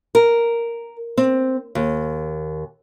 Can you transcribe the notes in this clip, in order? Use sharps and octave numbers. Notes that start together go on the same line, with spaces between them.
A#4
C4
D#2